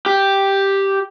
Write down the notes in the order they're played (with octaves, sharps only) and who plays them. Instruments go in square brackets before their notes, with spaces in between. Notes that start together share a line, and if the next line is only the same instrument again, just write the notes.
[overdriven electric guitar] G4